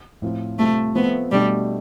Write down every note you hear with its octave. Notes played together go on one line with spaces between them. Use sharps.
A2 F3 C4 F4
C3 G3 A3 C4 F4
F3 A3 B3 C4
B2 G3 A3 D4 G4